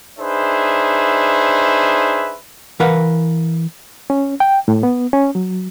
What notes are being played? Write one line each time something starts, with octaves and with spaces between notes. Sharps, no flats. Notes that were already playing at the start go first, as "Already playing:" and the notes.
D4 D#4 G#4 B4 C5 E5
E3 A#4 B4 F5 F#5
C#4
G5
A2
B3
C#4
F#3